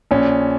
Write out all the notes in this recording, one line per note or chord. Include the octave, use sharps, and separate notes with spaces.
A#1 C#4